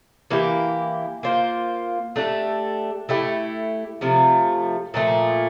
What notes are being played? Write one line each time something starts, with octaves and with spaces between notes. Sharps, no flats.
E3 A#3 E4 G4
A#3 F4 C5
A3 D4 G4
A3 E4 G4
C3 F3 A3
A#2 F3 A3